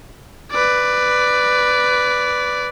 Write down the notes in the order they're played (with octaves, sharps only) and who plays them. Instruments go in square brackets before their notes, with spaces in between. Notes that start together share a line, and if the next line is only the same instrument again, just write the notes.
[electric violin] B4 D5